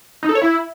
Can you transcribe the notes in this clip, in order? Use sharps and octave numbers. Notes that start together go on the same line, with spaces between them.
D#4
A4
C#5
E4